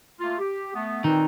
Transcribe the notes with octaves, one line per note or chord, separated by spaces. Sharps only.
A3 A#3 F4
G4
A3 B3
A#2 D#3 E3 C4